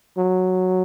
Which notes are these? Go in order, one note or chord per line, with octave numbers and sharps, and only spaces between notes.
F#3